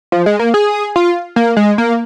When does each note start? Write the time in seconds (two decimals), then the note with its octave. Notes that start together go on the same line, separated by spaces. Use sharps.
0.12 F3
0.26 G#3
0.39 A#3
0.54 G#4
0.96 F4
1.36 A#3
1.57 G#3
1.78 A#3